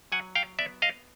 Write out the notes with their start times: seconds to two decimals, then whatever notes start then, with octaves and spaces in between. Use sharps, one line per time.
0.12 F#3 F#5 G#5
0.35 F5 G5
0.59 B3 D5 E5
0.82 D#5 F5